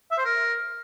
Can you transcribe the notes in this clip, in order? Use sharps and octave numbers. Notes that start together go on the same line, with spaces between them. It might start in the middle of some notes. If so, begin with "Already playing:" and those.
E5
C5
A#4